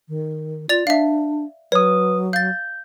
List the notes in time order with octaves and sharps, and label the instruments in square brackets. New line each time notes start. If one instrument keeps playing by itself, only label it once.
[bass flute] D#3
[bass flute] F4 [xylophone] D5 A6 F7
[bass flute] D4 [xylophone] E5 F5
[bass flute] F#3 [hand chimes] B4 D#6 [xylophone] C#5
[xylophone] F5 A6 [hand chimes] G6